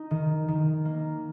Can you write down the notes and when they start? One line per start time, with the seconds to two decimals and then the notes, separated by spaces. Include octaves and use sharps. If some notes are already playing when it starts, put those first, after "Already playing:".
Already playing: D#4
0.11 D#3
0.48 D#3
0.85 A#3